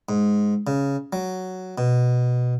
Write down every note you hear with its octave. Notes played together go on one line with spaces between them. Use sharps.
G#2
C#3
F#3
B2